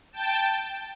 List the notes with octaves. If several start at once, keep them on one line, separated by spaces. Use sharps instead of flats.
G5 A5